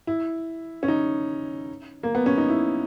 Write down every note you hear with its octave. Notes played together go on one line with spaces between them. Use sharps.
E4
C#4
D#4
A#3
B3
C#4
D#4
E4